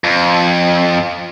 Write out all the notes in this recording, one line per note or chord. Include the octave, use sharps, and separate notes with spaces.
F2